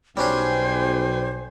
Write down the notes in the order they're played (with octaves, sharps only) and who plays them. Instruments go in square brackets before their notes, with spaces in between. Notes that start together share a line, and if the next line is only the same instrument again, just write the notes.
[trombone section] B1 [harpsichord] G3 C#4 D4 [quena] C5 [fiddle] G5 G#5